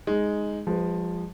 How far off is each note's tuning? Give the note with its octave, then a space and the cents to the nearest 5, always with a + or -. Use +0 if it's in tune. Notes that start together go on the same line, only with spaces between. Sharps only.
G#3 +0 D#4 +0
F3 +10 G#3 -35 B4 +20